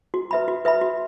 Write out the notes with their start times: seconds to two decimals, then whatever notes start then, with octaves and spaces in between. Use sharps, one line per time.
0.14 F#4
0.31 B4 E5 B5
0.48 F#4
0.65 B4 E5 B5
0.81 F#4